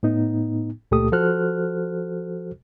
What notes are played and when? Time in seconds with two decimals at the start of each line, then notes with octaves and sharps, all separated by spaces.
0.03 A2 B3 D#4
0.91 C#2 A#2 A3 G4 A4 D#6
1.12 F3 F#4 A4 C5 F6 F#6